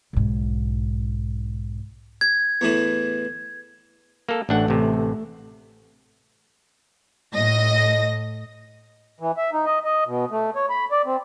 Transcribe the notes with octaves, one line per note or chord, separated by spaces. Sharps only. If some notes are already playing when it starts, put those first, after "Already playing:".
B1 G#2
G#6
E2 A2 E3
A#3 A4
A1 A3 D4 F#5
A1 C3
A2 D#5 A#6
E3
E5
D#4
D#5
D#5
B2
A3
C#5
B5
D5
C4